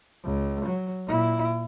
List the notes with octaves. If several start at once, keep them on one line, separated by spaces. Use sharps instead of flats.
C#2
F#3
A#2 E4